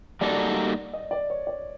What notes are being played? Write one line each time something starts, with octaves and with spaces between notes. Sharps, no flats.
G3 A#3 D#4 F#4 A4 D5
D#5
D5
C#5
D5